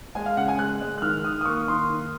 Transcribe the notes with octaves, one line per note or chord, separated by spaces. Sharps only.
G#3 G#5
F5
C#3 F#5
G#5
G#3 F#6
G#3
F#6
D#3 F6
D#3 D#6
D#6
A#3 C#6
D#3 C6
D#3